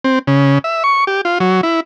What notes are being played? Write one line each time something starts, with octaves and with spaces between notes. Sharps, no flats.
C4
C#3
E5
C#6
G4
F4
F#3
E4